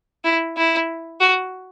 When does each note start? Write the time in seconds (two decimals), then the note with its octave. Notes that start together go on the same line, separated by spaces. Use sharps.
0.24 E4
0.57 E4
1.20 F#4